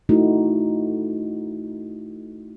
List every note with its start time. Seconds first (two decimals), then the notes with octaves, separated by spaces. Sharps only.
0.09 A3 D#4 E4 F#4